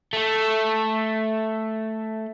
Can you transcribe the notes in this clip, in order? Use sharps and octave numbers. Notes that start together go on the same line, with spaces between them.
A3 A4